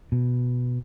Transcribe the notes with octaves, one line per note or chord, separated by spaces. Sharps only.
B2